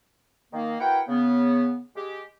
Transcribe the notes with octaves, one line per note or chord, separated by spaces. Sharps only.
D#3 A#3
E4 F#4 A#4 B4 F#5 G5
C#3 B3
G#3 G4